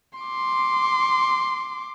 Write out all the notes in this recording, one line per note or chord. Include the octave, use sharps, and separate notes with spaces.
C6 D6